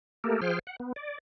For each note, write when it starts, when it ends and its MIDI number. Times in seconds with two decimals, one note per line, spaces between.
0.24 0.40 57
0.24 0.40 58
0.24 0.40 67
0.24 0.40 69
0.24 0.40 70
0.42 0.59 53
0.42 0.59 68
0.42 0.59 72
0.42 0.59 79
0.42 0.59 89
0.67 0.76 78
0.80 0.92 59
0.96 1.18 74